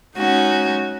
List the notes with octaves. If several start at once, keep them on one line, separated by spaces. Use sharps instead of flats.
G#3 C#4 D#4 F#4 G#5